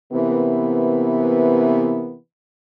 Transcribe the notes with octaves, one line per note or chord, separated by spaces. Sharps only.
C3 E3 A#3 B3